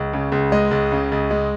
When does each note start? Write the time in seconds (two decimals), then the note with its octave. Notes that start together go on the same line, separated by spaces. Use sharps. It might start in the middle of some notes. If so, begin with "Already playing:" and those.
Already playing: C#2
0.13 C#3
0.32 C#2
0.52 G#3 D#5
0.71 C#2
0.92 C#3
1.12 C#2
1.31 G#3